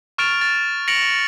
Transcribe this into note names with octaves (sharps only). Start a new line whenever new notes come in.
C#6 F6 A6 D7 F7
A6
A#6 C#7 D7 F7 F#7